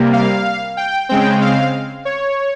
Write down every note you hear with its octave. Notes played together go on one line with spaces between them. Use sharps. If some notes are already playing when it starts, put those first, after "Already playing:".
Already playing: C3 G3 A#3
F5
G5
C#3 G#3 C4 G5
F5
C#5